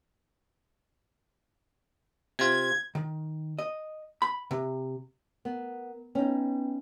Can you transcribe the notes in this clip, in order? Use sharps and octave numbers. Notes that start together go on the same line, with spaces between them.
C3 F4 G#6
D#3
D#5
B5
C3
B3 A#4
B3 C#4 D#4 B4 G5